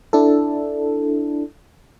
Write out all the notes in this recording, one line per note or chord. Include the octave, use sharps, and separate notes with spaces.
D4 E4 A4